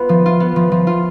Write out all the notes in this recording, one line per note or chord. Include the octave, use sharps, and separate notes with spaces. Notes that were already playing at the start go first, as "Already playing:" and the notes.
Already playing: B3 F4
F3
F4
B3
F3
F3
F4